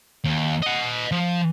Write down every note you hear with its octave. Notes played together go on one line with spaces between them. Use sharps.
D#2
D#5 F#5
F3